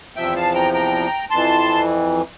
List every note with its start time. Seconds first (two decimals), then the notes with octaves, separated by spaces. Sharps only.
0.16 E2 C3 F3 E5 G5
0.36 F5 A5
0.54 G5 A#5
0.73 G5 A#5
1.30 F2 E3 A5 C6